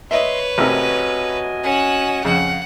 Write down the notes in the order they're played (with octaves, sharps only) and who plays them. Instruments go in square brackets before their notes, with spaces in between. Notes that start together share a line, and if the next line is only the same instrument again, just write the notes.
[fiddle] B4 C#5 [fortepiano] D#5 E5 [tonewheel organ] C6
[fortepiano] A1 C3 A#4 [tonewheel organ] F#4 D#5 G#5
[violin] C#4 E7 [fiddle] F#5 F#6
[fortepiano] F2 C#3 [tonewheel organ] F5 [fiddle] F#5